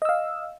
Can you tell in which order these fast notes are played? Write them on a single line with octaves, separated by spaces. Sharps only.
D#5 E6 F5